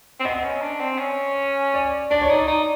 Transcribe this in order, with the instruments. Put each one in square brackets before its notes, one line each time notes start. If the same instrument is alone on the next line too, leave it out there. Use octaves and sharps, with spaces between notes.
[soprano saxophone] C4
[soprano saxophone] B3 [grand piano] D#5
[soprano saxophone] C#4
D4
C4
C#4
[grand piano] D5
[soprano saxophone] D4 [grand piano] D5
[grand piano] C#5
[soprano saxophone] D#4 [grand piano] D5
[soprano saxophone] D#4